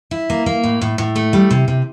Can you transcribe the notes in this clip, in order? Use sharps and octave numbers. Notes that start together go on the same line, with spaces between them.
E4
A#3
A#3
A2
A2
A2
A3
G3
C3
C3